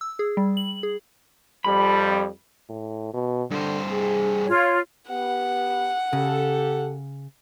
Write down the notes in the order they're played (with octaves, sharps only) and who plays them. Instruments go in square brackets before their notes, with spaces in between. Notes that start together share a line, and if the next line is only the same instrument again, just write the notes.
[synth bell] E6
G#4
G3
F#7
G#4
[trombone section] F2 G3 [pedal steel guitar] B5
[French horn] A2
B2
[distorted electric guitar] G2 C5 [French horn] D3
[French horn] G#4
[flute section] F4 C#5
[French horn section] B3 G4 [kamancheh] F#5
[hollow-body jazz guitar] C#3 [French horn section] G4 A4